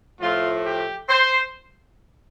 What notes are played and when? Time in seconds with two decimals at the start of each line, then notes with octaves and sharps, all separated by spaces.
0.20 A2 F3 A3 F4
0.65 G4
1.09 C5